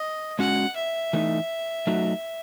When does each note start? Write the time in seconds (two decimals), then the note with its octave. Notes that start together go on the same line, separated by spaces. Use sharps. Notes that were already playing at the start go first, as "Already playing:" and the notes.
Already playing: D#5
0.39 G#3 C#4 F#4 F#5
0.76 E5
1.13 E3 A3 D#4
1.87 F#3 A3 D#4 F#4